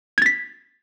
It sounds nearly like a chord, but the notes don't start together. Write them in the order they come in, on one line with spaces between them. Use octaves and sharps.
G#6 A6 B6